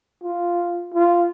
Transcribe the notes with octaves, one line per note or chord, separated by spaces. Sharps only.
F4
F4